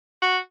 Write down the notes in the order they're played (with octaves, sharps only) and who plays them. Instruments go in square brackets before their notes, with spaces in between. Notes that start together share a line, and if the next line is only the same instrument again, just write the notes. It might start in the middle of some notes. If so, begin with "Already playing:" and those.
[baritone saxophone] F#4